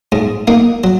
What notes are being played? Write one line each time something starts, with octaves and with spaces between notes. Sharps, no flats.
G#2
A#3 D#4
F#3